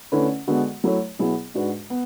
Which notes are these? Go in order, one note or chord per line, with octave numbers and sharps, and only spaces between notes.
D3 A3 C#4 E4 B4
D3 G#3 B3 F#4 A4
F#3 A3 E4 A4 C#5
B2 F#3 B3 E4 G#4
G#2 G#3 D4 F#4 B4
B3